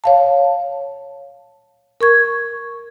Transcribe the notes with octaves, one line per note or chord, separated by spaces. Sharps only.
C#5 F5 A5
A#4 C#6 G#6